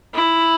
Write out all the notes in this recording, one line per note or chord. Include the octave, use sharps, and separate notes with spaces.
E4